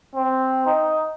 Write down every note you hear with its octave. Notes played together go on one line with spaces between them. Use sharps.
C4
D#4